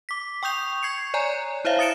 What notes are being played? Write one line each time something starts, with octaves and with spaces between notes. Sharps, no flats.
D6 B6
G5 C#6 D#6 G6 F7
C#6 G#6 C7 C#7
C#5 D5 G#5 A#5
E4 C5 C#5 E5 F5
D#6 A6 C#7 D7 E7